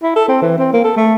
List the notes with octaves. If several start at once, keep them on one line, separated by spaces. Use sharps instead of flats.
E4
A4
C4
E3
C4
A#3
A4
A3